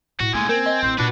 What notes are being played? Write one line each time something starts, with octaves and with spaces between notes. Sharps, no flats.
A2 F#4
A2 G#3 A#3 C#4 G#5
C4 A#4
D#5
A1 C5
A#2 D4 F#4 B4